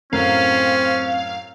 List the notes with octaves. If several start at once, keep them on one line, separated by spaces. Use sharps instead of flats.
F#2 A2 C4 C#4 A#4 F5